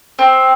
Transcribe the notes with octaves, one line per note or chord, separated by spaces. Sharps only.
C4